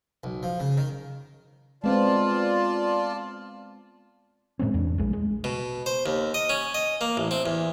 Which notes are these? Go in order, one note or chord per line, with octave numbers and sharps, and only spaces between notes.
B1
F3
C#3
D#3
G#3 B3 C4 F4 D5 A5
A2 G#3 C4 C#4
E2 D4
A#1 G#3
G#3
B2
C5
D#2
D#5
C#4
D#5
A#3
A1
C4
E2